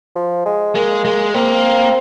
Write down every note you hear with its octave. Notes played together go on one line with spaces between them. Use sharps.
F3
G#3
G#3 A#3
G#3
A#3 C4